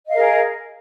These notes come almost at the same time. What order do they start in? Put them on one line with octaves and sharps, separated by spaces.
D#5 F5 A#4 G#4